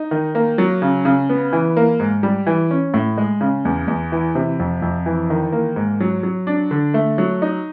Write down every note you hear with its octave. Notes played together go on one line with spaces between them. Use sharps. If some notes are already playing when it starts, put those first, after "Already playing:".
Already playing: D#4
D#3
A#3
F#3
C#3
C#3
B3
E3
A#3
G#2
G3
E3
C#4
A2
G#3
C#3
E2
E2
E3
C3
F2
F2
E3
D#3
A#3
G#2
F#3
F#3
D4
D3
A3
F#3
D#4